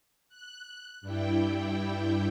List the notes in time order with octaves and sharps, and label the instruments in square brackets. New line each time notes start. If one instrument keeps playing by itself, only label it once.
[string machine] F#6
G2 G3 E4 G5